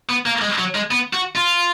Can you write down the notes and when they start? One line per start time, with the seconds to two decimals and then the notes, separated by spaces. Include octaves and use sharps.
0.09 B3
0.26 A#3
0.42 G#3
0.58 F#3
0.75 G#3
0.91 B3
1.13 F#4
1.35 F4